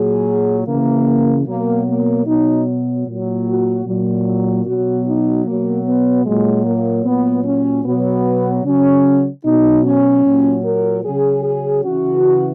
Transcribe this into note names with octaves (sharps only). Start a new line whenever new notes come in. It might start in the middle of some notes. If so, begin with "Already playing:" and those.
Already playing: A#2 F#3 G#4
C#3 E3 A#3
B2 F#3 A#3
A#3
B2 F#3 D#4
A#2 F#3
F#4
A#2 F#3
B2 F#3 F#4
D#4
B2 F#3 A#3
B3
A#2 F#3 G#3
A#3
A#2 F#3 B3
C#4
B2 F#3 B3
C#3 F#3 C#4
B2 F#3 D#4
C#4
A#2 F#3
A#4
C#3 F#3 G#4
G#4
C#3 E3 F#4